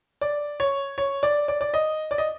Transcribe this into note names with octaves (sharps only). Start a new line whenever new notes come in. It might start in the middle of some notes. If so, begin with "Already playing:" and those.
D5
C#5
C#5
D5
D5
D5
D#5
D5
D#5